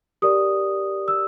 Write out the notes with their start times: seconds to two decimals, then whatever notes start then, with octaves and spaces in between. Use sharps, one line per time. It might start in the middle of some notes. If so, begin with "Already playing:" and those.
0.22 G4 A#4 D5 D#6
1.08 E6